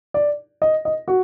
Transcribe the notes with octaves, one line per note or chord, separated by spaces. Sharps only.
D5
D#5
D#5
F#4